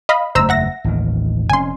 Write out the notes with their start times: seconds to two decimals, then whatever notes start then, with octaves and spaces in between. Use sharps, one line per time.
0.09 D#5 F5 B5
0.35 F#1 E2 A3 C5 A#5 E6
0.49 E5 F#5 A#6
0.84 A1 D#2 D#3
1.50 F1 C#4 G#5 C6